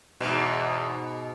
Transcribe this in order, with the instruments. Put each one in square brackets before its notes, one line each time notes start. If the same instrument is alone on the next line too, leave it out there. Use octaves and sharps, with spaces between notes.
[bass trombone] E2 [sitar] G#2 B2